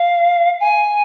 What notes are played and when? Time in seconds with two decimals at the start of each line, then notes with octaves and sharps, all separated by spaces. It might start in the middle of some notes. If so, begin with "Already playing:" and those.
Already playing: F5
0.60 G#5